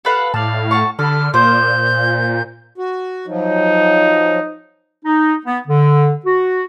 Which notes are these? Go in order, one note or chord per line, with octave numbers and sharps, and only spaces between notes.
A4 B4 F5 F#5
A2 D5 F5 A5
F#4 A5 C#6
D3 A4 B5 F6
A#2 A#3 C5 G6
F#4
F3 F#3 D#4
D#4
B3
D3
F#4